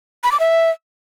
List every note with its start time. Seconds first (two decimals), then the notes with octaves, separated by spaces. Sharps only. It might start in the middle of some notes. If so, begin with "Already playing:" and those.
0.24 B5
0.32 D6
0.40 E5